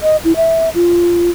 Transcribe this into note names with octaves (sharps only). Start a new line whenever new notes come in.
D#5
E4
E5
F4